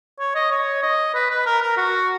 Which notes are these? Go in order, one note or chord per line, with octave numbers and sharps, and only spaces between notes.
C#5
D#5
C#5
D#5
B4
B4
A#4
A#4
F#4